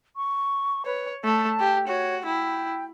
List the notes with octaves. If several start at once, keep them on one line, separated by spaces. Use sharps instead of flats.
C#6
B4 C#5
A3 A5
G4
F#4 C#5
E4 G5